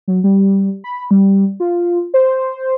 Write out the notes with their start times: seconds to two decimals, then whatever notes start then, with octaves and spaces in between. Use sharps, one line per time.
0.08 F#3
0.24 G3
0.84 B5
1.11 G3
1.60 F4
2.14 C5